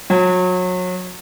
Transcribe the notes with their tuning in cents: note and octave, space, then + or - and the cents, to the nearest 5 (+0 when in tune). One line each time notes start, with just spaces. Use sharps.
F#3 -30